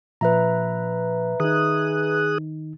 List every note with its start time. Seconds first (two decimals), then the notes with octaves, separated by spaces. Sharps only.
0.21 A#2 F3 B4 E5 A#5
1.40 D#3 D#4 G#4 D#6 F#6